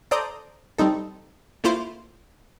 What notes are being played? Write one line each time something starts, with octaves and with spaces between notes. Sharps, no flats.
A4 C5 D5 A#5 D#6 G6
G3 C4 D#4 A4
A3 A#3 E4 F4 C5